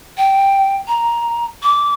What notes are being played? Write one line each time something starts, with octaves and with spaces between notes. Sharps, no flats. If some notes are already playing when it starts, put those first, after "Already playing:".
G5
A#5
D6